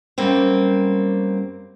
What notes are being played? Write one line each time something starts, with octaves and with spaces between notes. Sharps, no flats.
F#2 G3 A#3 C4